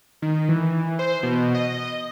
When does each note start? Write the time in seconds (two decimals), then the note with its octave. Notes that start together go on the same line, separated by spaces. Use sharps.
0.22 D#3
0.49 E3
0.99 C5
1.23 B2
1.55 D#5